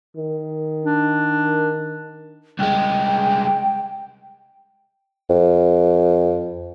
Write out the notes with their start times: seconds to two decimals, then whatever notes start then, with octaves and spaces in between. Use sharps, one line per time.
0.16 D#3
0.85 D4
2.59 C2 G#3 G5
5.30 F2